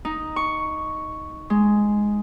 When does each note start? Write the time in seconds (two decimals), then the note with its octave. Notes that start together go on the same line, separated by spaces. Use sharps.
0.05 D#4
0.36 C#6
1.50 G#3